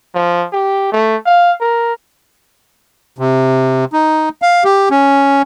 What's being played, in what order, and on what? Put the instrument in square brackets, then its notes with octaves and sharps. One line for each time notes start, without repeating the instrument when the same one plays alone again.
[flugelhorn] F3
G4
A3
F5
A#4
[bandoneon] C3
D#4
F5
G4
C#4